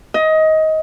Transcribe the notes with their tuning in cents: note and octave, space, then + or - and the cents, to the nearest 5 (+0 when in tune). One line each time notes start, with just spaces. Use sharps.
D#5 +20